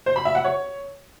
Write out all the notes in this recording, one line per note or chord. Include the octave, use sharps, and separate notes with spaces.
C5
B5
E5
F#5
C#5